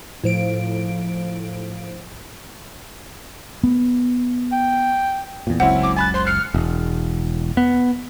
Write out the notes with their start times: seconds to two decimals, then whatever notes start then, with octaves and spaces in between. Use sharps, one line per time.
0.24 A2 F3 D7
3.64 B3
4.52 G5
5.47 E2 A#2
5.60 F#1 C#2 F#2 C4 C#4 E4 F#5
5.83 D6
5.97 G#5 B5 F#6 A6
6.14 C5 C6
6.26 F6 F#6 C7 C#7
6.54 E1
7.57 B3